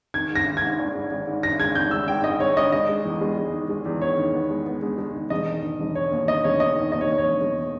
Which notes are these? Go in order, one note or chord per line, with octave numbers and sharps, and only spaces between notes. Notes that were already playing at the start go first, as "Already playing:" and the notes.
D#3 G#6
G#2
A#6
D#3
G#6
G#2
G#1
G#2
G#1
G#2
D#3 A#6
G#3 G#6
G#1 G6
G#1 E6
G#2 G5
G#2 D#5
G#1 C#5
G#1 D#5
G#3 D#5
G#3
E2
G#3
G#3
D#3
G#3
E2
D#3 C#5
D#3
B3
G#3
B3
G#3
G#3
D#3
E1 D#5
D#3
D#3
E1
D#3 C#5
D#2
D#3 D#5
E1 C#5
D#3 D#5
D#3
D#2 D#5
C#5
D#2
C#5
E1
E1